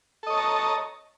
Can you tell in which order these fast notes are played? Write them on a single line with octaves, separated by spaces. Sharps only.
A4 D#5 C#5 A5 A#5